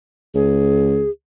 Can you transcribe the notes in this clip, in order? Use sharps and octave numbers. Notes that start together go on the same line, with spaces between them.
C#2 G#4